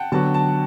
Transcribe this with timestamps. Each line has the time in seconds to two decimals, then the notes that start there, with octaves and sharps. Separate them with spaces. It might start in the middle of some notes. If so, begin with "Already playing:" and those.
Already playing: F#5 G5 A5
0.12 D3 F#3 B3 F#4 A5
0.34 A5